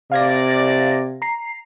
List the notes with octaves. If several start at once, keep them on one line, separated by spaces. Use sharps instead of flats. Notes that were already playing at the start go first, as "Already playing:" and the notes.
C3 D5 F5 G#6 A#6
A#5 C7